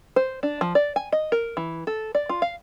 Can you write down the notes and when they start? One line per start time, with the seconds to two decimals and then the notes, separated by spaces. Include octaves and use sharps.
0.16 C5
0.43 D4
0.61 F3
0.75 D5
0.96 G#5
1.12 D#5
1.32 A#4
1.57 E3
1.87 A4
2.15 D5
2.29 F4
2.42 F5